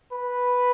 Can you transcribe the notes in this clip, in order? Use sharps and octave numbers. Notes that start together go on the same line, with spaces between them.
B4